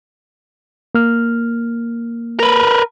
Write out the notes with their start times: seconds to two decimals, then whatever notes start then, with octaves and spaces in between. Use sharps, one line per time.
0.95 A#3 F6
2.40 A#4 B4